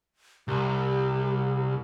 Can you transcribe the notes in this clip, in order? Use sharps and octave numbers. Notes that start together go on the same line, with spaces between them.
C2 G4